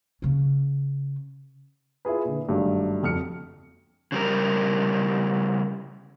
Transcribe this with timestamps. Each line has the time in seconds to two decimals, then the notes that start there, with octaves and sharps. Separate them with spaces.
0.22 C#3 C#4
2.05 E4 F4 G#4 B4
2.25 A#2 D3
2.48 G#1 G2 F#3 A3
3.03 F2 F6 C#7
4.12 C#3 G3 A#4